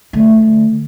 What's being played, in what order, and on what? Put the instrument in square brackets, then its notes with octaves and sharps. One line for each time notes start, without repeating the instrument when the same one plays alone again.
[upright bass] D3 A3